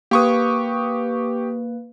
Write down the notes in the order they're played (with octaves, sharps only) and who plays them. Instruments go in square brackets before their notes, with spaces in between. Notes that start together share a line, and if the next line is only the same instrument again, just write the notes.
[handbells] A#3 B4 [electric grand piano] G4 C#6 D#6